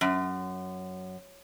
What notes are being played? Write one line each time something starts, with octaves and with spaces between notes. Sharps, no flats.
F#2